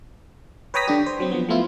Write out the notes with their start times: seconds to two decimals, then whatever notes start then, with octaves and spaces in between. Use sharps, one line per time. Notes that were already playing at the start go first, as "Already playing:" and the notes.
0.74 B4 C#5 G5 A#5 D#6 B6
0.88 D3 D4 G4
1.06 C5
1.20 F#3 C4
1.31 F3 B3
1.49 F3 A3 B3 E4 F4